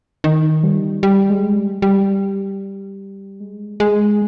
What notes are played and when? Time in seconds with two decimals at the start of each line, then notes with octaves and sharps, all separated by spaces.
0.24 D#3
0.63 G3
1.03 G3
1.30 G#3
1.56 G3
1.82 G3
3.40 G#3
3.80 G#3